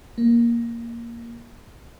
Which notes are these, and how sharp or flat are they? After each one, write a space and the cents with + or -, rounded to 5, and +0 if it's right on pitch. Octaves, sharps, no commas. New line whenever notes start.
A#3 +5